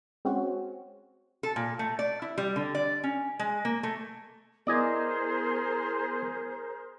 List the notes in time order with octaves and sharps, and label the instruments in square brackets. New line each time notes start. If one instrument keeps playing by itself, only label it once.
[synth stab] G#3 C4 C#4 F#4
[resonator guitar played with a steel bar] A4
A#2
A3
D5
E4
G3
D3
D5
C#4
G#3
A#3
A3
[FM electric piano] B3 E4 [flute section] G#4 C5 [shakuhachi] A#4 [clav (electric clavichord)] D5 D#5 G#5